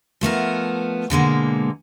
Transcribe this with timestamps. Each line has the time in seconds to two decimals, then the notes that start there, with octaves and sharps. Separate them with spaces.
0.21 F3 A3 B3 A#4
1.10 B2 D3 G#3 A#3